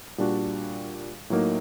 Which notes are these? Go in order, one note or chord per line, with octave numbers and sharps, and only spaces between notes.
A#2 G3 D4 F#4
A2 F#3 A#3 D#4